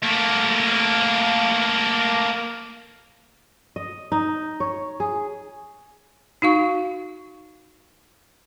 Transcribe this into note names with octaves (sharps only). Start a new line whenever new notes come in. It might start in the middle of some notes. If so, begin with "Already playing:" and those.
A3 A#3
D#5
D#4
C#5
G#4
D#4 F#4 F5 C#6